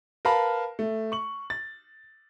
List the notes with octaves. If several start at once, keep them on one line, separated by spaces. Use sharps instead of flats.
A#4 B4 F5 A5 B5
A3
C#6 F#7
A6